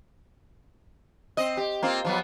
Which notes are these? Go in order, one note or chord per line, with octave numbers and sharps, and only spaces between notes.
C4 D#5
G4
A#3 C4 F4
F3 F#3 B3